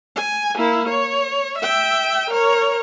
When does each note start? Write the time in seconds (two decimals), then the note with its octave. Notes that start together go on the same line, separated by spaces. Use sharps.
0.16 G#5
0.57 A#3 E4
0.89 C#5
1.59 E5 G5
2.30 A#4 C#5